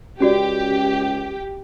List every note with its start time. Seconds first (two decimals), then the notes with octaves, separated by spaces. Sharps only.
0.20 C#2 C#4 F#4 G4 D5